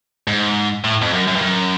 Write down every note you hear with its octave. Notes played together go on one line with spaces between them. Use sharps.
G#2
A2
F2
F#2
F#2
G2
F#2